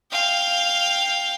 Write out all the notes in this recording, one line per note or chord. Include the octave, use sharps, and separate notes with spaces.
F5 G5